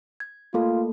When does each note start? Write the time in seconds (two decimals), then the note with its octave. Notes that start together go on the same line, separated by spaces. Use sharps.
0.20 G#6
0.54 A3 A#3 F4 A4